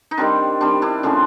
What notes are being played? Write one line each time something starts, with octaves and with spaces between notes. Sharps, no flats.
D#4
D#3 G3 C4 D4
D#3 G3 C4 D4
D4 E4
C#3 F3 A3 C4 D4